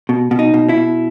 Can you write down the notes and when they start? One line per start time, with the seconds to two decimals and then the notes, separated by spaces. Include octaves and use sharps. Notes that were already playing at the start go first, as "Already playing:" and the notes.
0.09 B2
0.31 B2
0.39 D#4
0.54 B2
0.69 E4
0.77 B2